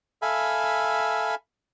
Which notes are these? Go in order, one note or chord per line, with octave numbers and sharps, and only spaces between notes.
A4 E5 F5 G#5 B5